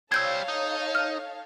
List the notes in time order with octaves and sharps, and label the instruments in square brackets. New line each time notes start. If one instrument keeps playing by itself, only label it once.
[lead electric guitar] G3 C5 [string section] A4 C#5 F5 [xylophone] E6 G6 G#6
[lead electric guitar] D#4
[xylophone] F6